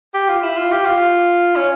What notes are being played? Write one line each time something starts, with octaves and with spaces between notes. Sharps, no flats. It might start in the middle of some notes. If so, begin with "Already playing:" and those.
G4
F4
E4
F4
G4
F4
C#4